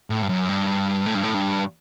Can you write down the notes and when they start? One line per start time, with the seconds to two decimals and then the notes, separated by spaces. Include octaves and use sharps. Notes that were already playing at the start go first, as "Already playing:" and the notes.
0.10 A2
0.22 G2
0.29 F#2
0.49 G2
1.06 A2
1.15 G2
1.24 A2
1.34 G2